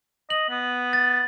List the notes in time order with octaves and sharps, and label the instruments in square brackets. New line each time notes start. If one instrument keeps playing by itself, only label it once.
[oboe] D#5 [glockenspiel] F#7
[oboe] B3
[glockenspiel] A6